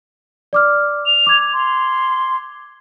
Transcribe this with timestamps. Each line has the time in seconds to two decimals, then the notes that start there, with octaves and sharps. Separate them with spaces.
0.53 D5 D6 F6
1.06 F7
1.27 D6 G#6
1.53 C6